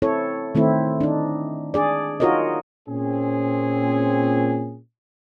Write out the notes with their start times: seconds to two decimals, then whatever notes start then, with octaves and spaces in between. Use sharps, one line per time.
0.02 C4 E4 A4 C#5
0.55 D#3 A3 C4 E4
1.01 D4 D#4
1.74 D4 G#4 D5
2.20 D#4 F4 F#4 A#4 C#5 D#5
2.88 A#2 C4 C#4 G#4